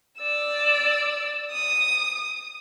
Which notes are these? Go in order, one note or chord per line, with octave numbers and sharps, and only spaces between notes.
D5 E6
D#6